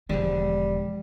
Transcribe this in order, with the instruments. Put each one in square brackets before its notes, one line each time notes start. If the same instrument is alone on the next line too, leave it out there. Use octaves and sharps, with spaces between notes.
[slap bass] E1 D3 [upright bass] F3 G#3 [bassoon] G3